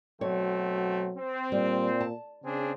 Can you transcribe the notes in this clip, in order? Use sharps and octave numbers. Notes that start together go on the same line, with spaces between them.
B2 F#3 A3 C4 C#5
C4
A#2 G3
A5
C#3 C4 D4 G#4